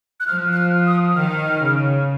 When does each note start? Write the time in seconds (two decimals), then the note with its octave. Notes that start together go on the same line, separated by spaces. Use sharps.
0.20 F#6
0.27 F3 F6
0.52 F#6
0.57 F6
0.87 D#6
1.16 D#3 F6
1.61 C#3